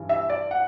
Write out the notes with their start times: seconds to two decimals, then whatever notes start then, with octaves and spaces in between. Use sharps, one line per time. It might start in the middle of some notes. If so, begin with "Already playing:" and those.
Already playing: G2 E3
0.09 E5
0.30 D5
0.51 F#5